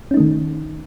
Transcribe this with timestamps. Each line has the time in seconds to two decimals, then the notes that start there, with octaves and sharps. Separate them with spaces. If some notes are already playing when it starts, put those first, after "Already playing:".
0.11 C#4
0.14 D#4
0.17 A3
0.20 D#3